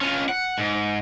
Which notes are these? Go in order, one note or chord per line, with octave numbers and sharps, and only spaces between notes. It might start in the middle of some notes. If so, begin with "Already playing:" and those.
C#4 F4
F#5
G#2